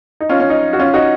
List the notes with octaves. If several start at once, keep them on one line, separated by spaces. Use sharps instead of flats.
D#4
C#4 F4
C#4
D#4
F#4
C#4 F4
D#4 F#4